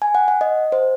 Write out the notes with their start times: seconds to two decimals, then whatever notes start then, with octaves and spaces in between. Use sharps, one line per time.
0.02 G#5
0.15 F#5
0.28 F#5
0.41 D#5
0.72 C5